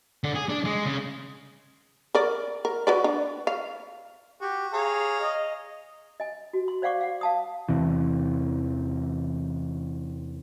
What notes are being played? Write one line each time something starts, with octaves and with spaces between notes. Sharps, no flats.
D3
G#4
D4
G#3
C#3
A#4 D5
A#4
F#4 B4 D5
D4
F5
F#4 G4
G#4 C#5 F5 A#5
D#5
D#5 G#5
F#4
C6
C5 D5 F5 F#5 C#6 D6
F5 F#5
F5 A5 D#6
E2 C3 E3